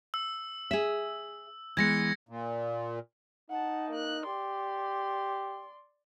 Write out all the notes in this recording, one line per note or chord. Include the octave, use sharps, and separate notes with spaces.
E6
G#4 E5
E3 G#3 B3 G#6 A#6 C#7
A#2
D#4 F#5 A5
A#3 F#6
G4 D5 C6